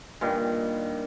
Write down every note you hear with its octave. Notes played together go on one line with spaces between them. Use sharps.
G2 A#2 D#3